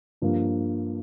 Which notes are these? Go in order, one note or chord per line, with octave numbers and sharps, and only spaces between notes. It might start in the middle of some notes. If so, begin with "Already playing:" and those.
G2 F3 A#3